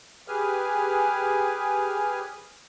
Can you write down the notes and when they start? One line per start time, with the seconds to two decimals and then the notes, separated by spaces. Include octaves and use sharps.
0.28 G4 G#4 B4 G#5 F6